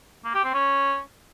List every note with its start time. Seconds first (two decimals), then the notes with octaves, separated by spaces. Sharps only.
0.25 A#3
0.34 G4
0.44 C4
0.54 C#4